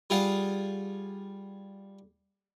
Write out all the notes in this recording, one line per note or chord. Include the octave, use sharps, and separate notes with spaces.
G3 F4 G#4 F5 F#5